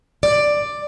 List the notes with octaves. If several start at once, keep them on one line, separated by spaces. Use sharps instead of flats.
D5